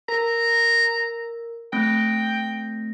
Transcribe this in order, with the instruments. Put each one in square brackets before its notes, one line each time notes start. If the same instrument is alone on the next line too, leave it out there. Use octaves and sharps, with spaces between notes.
[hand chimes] A#4 [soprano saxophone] A#5
[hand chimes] A3 C4 A#6 [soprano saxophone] G5